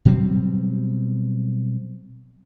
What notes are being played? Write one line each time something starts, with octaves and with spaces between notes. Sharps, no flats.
B2 F#3 G3 C4